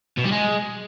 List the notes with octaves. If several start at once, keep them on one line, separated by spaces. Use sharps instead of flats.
B2
G3
G#3